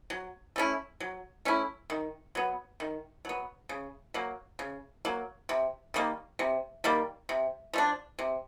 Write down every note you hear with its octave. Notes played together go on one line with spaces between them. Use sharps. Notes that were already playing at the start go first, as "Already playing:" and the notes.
F#3
A3 C#4 E4
F#3
A3 C#4 E4
D#3
F#3 B3
D#3
F#3 B3
C#3
F#3 A#3
C#3
F#3 A#3
C3
D#3 G3 A#3
C3
D#3 G3 A#3
C3
F3 A3 D4
C3